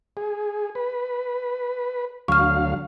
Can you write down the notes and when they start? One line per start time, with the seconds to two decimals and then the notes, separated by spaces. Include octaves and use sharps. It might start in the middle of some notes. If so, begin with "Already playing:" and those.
0.17 G#4
0.75 B4
2.28 D2 F#3 F5 C#6 F6